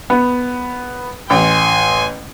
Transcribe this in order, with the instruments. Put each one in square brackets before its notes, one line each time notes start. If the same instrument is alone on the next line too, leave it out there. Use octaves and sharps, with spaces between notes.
[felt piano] B3
[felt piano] A1 [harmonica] G#5 C6